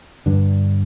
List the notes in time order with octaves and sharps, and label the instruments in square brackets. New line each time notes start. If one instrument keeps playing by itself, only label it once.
[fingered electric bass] G2 D3